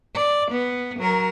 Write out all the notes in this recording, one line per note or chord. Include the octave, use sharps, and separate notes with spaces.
D5
B3
F#3 A#4